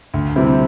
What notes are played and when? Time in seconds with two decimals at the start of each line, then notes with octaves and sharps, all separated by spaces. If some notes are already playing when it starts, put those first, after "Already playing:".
0.14 D2
0.36 C3 G3 C4 E4